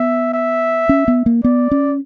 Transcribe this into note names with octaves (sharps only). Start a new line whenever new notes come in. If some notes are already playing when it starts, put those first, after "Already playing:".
Already playing: B3 E5
E5
C#4
B3
A#3
B3 D5
C#4